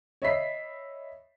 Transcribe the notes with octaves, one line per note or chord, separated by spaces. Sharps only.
C#5 D#5 E5 B5 B6 C7